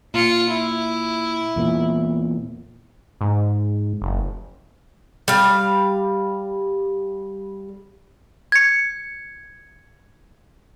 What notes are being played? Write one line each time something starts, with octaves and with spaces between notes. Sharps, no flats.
A#2 F4 C#7
E4
E2 A#2
G#2
F#1
G3 F5
G#6 C#7